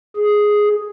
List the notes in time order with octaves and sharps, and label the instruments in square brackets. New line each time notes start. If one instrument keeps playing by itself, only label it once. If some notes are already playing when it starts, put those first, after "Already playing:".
[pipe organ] G#4